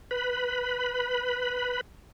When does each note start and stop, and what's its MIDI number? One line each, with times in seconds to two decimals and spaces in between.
0.11 1.81 71
0.11 1.81 83